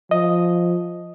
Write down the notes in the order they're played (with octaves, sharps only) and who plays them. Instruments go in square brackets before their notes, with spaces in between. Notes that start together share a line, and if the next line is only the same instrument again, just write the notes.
[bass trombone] F3 [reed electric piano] D#5